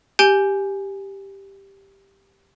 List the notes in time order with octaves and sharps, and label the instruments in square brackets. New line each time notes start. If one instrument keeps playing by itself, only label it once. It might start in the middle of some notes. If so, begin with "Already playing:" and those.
[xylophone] G4 G#5 G6 D7 G7